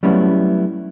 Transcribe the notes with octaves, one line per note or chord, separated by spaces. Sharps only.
F#3 G3 A3 B3 C#4 E4